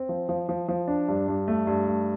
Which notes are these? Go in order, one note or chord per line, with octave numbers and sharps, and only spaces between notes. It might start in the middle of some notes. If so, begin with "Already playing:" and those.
Already playing: C4
F3
F3
F3
F3
D4
G2
G2
A3
G2
A3